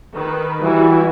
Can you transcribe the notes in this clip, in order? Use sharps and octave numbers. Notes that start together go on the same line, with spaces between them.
D#3 B4
E3 G3 E4 F#4